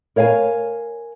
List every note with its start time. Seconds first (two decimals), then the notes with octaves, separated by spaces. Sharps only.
0.16 A#4 C#5 F5 F#5 G#5